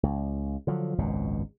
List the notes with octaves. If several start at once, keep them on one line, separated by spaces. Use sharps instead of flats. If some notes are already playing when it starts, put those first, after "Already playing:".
C#2
D3 F3 F#3
G#1 C#2 F#2 B2